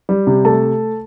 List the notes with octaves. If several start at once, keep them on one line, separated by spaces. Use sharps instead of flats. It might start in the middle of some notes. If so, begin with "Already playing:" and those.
G3
C3
A3 A4 A5